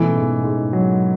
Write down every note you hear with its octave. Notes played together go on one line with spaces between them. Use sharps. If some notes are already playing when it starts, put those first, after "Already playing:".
Already playing: B2 E3 A3 C#4
G#2
G#2
F#3